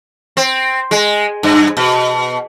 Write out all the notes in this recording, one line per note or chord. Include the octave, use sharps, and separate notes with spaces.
C4
G#3
G2
B2